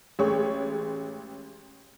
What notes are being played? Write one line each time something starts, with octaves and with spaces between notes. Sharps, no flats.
A1 G#3 C#5